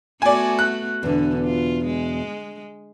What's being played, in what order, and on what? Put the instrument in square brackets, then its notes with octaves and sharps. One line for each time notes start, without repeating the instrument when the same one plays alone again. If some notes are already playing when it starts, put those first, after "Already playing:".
[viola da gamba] A3 B3 F#4 [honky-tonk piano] D5 G#5
[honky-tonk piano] F#6
[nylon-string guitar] E2 B2 [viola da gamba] D3
[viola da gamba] F4
G#3